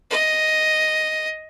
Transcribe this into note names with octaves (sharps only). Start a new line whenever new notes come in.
D#5